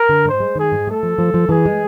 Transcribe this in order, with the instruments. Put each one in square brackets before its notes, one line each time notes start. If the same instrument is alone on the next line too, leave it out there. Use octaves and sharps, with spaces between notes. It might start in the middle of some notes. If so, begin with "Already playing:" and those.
Already playing: [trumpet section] A#4
[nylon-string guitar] D3
[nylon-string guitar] G#2 [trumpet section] C5
[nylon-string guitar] G#3
[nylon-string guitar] D#3 [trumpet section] G#4
[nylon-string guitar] G#2
[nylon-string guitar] A3 [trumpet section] A4
[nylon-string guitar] F3
F3
F3
[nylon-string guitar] E3 [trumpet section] G#4
[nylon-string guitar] G#3